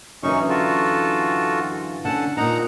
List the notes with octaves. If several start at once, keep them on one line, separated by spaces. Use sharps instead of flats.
F#2 D3 E3 C#4 D#4 C#6
F4 F#4 A4
D3 C#4 A4 F#5 A5
A#2 C4 D#4 F#5 A#5